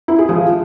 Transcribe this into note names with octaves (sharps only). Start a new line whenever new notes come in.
E4
G#4
F3